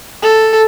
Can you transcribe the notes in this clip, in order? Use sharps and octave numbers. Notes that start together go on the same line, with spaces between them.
A4